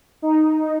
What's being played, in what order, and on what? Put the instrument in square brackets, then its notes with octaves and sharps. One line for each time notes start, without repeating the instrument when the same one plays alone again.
[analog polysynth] D#4